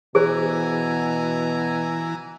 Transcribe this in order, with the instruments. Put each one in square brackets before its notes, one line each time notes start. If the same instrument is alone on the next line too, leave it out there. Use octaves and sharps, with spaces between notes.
[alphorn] B2 [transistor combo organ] E3 [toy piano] G#4 C5 [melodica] G#5 A#5